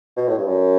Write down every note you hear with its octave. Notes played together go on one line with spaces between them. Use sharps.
B2
A2
G2
F#2